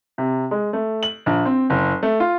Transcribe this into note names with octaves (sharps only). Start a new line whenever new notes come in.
C3
G#3
A3
F#7
A#1
C4
F#1
A3
F4